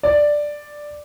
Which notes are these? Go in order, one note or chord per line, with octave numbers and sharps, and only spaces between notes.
D5